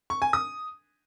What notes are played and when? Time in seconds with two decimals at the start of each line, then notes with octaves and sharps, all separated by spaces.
0.10 C#6
0.22 G#5
0.33 D#6